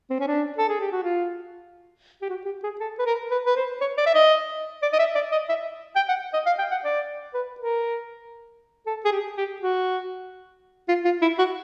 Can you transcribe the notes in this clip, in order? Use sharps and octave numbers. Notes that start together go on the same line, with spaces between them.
C4
C#4
D4
A4
G#4
G4
F#4
F4
G4
F#4
G4
G#4
A4
B4
A#4
B4
B4
C5
C#5
D5
E5
D#5
D5
D#5
E5
D5
D#5
E5
G5
F#5
D#5
F5
G5
F#5
D5
B4
A#4
A4
G#4
G4
G4
F#4
F4
F4
E4
F#4